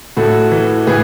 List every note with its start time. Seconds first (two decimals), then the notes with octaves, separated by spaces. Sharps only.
0.17 A2 F#4 A4
0.52 E3
0.87 A2 G#4 B4